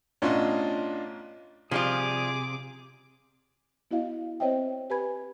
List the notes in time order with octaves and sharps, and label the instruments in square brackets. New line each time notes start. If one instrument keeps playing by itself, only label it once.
[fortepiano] A1 B2 C#4 [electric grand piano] D4 F4 D#5
[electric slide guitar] C3 [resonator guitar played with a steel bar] F3 G3 F4 [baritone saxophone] G#4 [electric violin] D6 D#6
[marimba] B3 E4 F#4 D#5 F5
C4 C5 C#5 D#5 E5 G5
G4 B4 G#5 B5 G#6